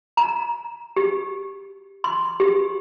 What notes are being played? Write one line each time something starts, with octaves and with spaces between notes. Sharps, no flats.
A#5
G4
C6
G4